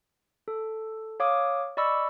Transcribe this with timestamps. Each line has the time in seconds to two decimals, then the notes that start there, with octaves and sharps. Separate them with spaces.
0.48 A4
1.20 C#5 F5 D6 D#6
1.77 D5 D#5 B5 C#6 E6